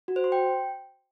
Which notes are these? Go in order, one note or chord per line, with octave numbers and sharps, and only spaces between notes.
F#4
C5
C6
G5